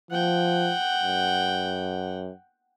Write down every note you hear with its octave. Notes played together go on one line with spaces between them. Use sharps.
F3 F#5 G5
F#2